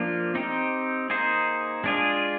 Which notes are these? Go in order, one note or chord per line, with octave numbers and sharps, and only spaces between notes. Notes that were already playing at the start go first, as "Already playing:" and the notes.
Already playing: F3 A#3 D4 F4
C4 D#4 G4
A#3 D#4 G#4 C5
G#3 D4 F4 G#4